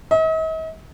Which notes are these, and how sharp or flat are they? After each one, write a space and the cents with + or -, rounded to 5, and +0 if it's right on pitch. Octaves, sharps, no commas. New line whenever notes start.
D#5 +45